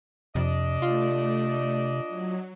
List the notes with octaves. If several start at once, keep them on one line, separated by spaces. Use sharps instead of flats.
F2 C3 D4 D5 D#5
A3 F4
F#3